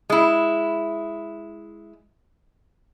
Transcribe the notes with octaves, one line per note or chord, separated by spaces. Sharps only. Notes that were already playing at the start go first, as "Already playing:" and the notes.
G#3 E4